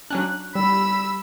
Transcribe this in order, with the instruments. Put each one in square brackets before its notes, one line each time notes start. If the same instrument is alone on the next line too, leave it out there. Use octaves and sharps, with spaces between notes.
[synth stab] F#3 C#4 D4 [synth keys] F#6
[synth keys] G3 [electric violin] B5 E6